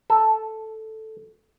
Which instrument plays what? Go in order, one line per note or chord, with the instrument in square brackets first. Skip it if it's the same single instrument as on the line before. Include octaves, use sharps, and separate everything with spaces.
[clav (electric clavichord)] A4